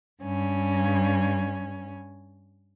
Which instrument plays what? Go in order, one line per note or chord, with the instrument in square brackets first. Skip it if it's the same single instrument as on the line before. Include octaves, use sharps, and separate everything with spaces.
[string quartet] G2 C#4